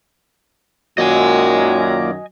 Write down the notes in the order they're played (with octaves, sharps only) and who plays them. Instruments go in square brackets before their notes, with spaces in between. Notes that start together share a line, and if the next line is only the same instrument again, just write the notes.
[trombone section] F#2 D#3 [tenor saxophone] F#3 [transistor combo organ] A#3 F4 D5 [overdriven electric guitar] D#5 G#5